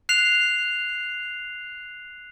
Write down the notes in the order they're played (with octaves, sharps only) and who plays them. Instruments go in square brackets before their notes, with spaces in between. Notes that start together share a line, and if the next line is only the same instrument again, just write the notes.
[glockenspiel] F#6 C7 F7